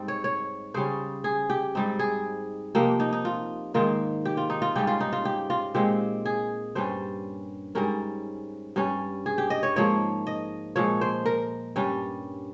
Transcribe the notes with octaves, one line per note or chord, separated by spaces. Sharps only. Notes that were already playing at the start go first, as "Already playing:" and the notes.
Already playing: G#2 G3 C4 D#4
C#5
C#5
C#3 G3 C#4 C5
G#4
G4
G#2 G3 C4 D#4
G#4
C3 F3 A#3 D#4 G4
D#4
D#4
F4
G#2 D#3 A#3 F4
G4
F4
D#4
F4
G#2 G3 C#4 G4
F4
D#4
F4
G4
F4
A#2 G#3 C4 G4
G#4
G2 G3 C#4 C5
G#2 G3 C#4 A#4
G2 G3 C#4
G#4
G4
D#5
C#5
G#2 F3 A#3 C#5
D#5
A#2 F3 G#3 C#5
C5
A#4
G2 G3 C#4